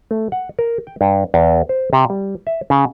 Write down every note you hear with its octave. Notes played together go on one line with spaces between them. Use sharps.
A3
F#5
A#4
G5
G2
E2
C5
C3
G3
E5
C#3